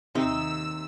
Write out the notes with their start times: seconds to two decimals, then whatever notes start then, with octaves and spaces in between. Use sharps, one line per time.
0.15 D#2 C3 D#4 E6